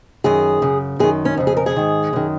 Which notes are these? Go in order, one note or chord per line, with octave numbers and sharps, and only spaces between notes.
F#2 D#3 G#4
F#2 C#3
F#2 D#3 G#4
C#4
F2 C#3
G#4
A#4
G#4
G#2 D#3
F#2 D#3